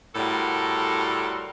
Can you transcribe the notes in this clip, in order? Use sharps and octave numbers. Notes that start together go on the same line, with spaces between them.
A2 G3 F#4 A4 A#4 C6